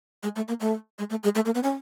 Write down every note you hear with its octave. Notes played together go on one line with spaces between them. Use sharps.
G#3
A3
A#3
A3
G#3
A3
G#3
A3
A#3
B3
C#4